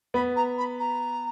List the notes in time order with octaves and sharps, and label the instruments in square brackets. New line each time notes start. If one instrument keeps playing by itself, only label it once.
[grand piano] B3 [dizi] B5
[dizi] A#5
B5
A#5